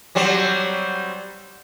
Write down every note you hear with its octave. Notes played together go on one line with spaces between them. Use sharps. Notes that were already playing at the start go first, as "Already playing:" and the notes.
F#3 G3 C4